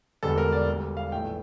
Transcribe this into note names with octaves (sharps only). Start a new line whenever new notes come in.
E1 E2 D3 G3 A4
A#4
D5
D2 D3 G3
F5
A#1 A2 E3 A3 G5